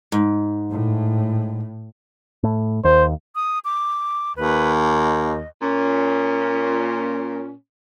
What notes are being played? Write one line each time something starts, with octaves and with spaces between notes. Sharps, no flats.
G#2
A2
A2
D#2 C5
D#6
D6
D#2 B4
D#5
A#2 C#4